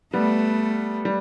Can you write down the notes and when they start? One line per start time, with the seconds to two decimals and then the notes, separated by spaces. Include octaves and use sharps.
0.13 G3 A3 B3
1.05 G3